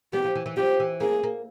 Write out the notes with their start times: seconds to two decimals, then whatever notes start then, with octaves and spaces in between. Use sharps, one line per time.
0.13 B3 G4
0.24 F3
0.35 E3
0.46 E3
0.57 F3 G4
0.80 E3
1.01 A#3 G#4
1.24 A#3